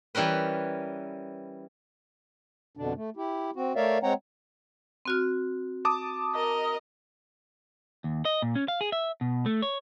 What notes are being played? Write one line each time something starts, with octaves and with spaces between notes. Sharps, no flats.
E3 G3 C#4 A#4 B4
F2 B2 D3 D4
A3
E4 G4
C4 F#4
A3 A#4 C#5 D5 E5 F5
G#3 C4 C#5 F#5 G5 A#5
C4 F#4 F6
A5 D6 D#6
A#4 D#5
D#2
D#5
A#2
C#4
F5
G#4
E5
B2
A3
C#5